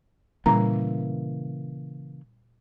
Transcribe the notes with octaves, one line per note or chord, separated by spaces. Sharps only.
A#2 C#3 E3 G3 A#3 A#5